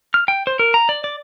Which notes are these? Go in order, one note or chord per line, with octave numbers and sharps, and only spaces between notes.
F6
G5
C5
A#4
A#5
D5
D5